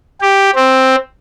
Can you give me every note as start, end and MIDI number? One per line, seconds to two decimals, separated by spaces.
0.21 0.50 67
0.55 0.95 60